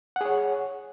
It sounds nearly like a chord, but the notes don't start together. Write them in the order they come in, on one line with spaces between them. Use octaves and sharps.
F#5 G#4 C#5